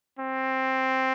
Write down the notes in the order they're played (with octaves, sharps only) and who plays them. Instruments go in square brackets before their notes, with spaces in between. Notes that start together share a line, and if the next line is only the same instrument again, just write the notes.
[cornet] C4